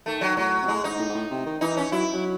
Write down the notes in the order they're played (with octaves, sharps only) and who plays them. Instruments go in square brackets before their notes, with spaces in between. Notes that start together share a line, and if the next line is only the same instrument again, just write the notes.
[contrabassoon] D#3 [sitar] A3
[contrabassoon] D#3 [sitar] F#3
[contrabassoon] A2 [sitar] F#3
[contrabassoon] C3
[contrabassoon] A2 [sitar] G#3
[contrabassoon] G#2 [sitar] D#4
[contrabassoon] A2
G#2
A2
C3
D#3
[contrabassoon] E3 [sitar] D#4
[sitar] C#4
[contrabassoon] F#3 [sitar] E4
[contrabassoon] F#3